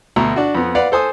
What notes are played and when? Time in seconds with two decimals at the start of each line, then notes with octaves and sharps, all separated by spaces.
0.16 D2 B2 A#5
0.36 D4 F#4
0.55 F2 B3
0.75 B4 D5 F5 F#5
0.92 A4 C5 G#5 D#6